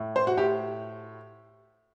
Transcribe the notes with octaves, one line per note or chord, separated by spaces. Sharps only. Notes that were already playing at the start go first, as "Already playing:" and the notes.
Already playing: A2
C5
F#4
A2 G4